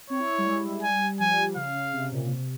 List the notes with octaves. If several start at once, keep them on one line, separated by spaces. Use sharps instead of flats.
C4 C#5
E4
G3
G#3
G3
G#5
F3 G#5
C#3 F5
C#3
C3
A#2
C#3
C3